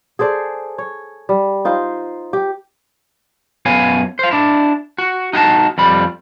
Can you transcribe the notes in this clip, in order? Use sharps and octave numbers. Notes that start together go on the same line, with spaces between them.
G#4 A4 C5 D5
C#5
G3
D#4 F4 C5
G4
F#2 B3 C#5 F5 G#5
C5 F5
D4 E4
F#4
D#4 F#4 G5 A5
F2 G3 B5